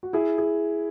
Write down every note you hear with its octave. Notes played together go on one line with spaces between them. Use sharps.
F#4
E4 G#4
G#4